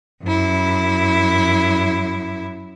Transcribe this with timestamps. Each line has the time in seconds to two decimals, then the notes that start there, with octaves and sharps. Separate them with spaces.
0.23 F#2 E4